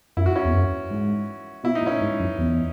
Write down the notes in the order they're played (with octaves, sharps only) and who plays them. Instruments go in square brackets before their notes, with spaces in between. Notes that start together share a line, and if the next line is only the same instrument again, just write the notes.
[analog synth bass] F#2 [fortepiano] E4
[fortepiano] F#4
C#4 E4
[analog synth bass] E2
F#2
G#2
[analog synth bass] B2 [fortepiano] E4
[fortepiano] D#4
[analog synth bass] A#2
[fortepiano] C#4 E4
[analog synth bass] G#2
F#2
E2